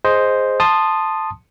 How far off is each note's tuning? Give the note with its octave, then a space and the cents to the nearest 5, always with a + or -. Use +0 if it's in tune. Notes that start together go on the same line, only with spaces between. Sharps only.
G#4 +0 C5 +0 D#5 +0
A5 +0 C6 +0 D#6 -15